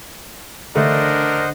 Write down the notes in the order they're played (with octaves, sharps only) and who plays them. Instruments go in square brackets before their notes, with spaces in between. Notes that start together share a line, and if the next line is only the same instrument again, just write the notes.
[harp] D3 [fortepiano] A3 [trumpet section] D4 A#4 [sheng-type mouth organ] C5 D#5 F#5